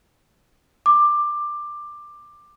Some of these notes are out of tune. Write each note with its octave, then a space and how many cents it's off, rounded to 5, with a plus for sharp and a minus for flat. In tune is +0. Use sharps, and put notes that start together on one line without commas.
D6 +15